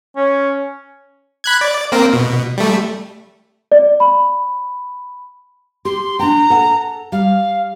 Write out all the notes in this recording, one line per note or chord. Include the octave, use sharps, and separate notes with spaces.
C#4
B5 F#6 G#6
D5
A#3 C4 A#4
B2
G3 A3
D5
B5
G4 C6
D4 G5 A#5
A4 F#5 A5
G3 F5